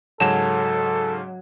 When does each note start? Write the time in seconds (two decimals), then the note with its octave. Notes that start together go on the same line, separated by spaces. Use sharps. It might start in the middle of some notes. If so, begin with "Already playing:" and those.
0.20 G#2 C#3 F#3 C#4 A4 A5 E7